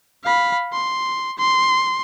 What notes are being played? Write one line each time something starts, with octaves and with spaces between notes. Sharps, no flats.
F5 B5
C6
C6